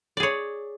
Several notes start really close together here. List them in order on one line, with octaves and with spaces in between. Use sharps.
D5 G#4 C#5